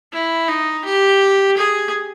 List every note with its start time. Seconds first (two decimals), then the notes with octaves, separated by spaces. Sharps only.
0.13 E4
0.48 D#4
0.85 G4
1.57 G#4